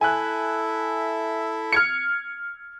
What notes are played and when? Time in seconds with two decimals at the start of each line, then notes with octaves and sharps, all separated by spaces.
0.01 E4 A4 E5 G#5 F#6
1.73 F6 G#6 C#7